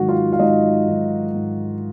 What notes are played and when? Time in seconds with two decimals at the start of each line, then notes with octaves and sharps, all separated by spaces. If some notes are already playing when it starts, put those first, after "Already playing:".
Already playing: G#2 D#3 F#3 F#4 F#5
0.09 F4 F5
0.33 F5
0.39 G#2 D#4 D#5
0.88 D#3 F#3
1.35 G#2